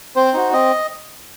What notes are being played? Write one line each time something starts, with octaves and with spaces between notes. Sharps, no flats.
C4 C5
D#4 F#4
C4 D#5